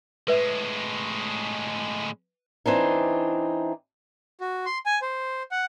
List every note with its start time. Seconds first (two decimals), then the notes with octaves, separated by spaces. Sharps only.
0.28 A2 G#3 B4 E5
2.66 E3 C4 D4 D#4
4.41 F#4
4.66 C6
4.86 G#5
5.02 C5
5.51 F#5